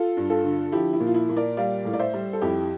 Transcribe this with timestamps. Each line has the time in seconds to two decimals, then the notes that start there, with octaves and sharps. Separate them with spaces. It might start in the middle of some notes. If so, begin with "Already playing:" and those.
Already playing: F4 A4
0.17 G2
0.30 F4 A4
0.44 D3
0.72 F3 E4 G4
0.93 E4
1.00 A#2
1.07 F4
1.14 E4
1.29 A#2
1.36 A#4 D5
1.57 G3 D5 F5
1.85 A2
1.94 D5
1.99 C5 E5
2.14 G3
2.33 A4
2.41 F2 E4 G4